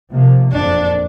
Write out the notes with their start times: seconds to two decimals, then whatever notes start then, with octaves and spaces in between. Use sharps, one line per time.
0.10 C3 F3 A#3
0.52 F#1 F2 A#2 D4